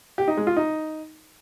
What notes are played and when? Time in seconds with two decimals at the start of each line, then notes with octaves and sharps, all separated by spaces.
0.18 G4
0.28 D#4
0.37 G#3
0.47 F4
0.57 D#4